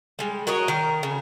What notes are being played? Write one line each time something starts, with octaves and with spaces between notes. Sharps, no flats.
G3 G#3
F#4 A#4 C#5 D#5
D#3 A#4
C#3